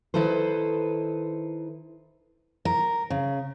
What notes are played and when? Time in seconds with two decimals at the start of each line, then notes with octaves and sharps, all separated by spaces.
0.14 D#3 E4 A4 B4 C5
2.65 A#4
3.10 C#3